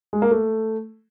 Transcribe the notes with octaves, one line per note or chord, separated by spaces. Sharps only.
G#3
A#3
A3